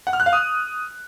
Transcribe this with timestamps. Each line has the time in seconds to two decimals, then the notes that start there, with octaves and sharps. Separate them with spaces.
0.07 F#5
0.13 F6
0.20 F#6
0.26 F5
0.33 D#6